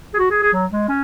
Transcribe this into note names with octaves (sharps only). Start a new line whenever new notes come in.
G#4
F#4
G#4
G#4
F#3
G#3
C#4